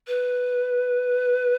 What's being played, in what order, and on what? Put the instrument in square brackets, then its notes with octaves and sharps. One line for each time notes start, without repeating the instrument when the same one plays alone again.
[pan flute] B4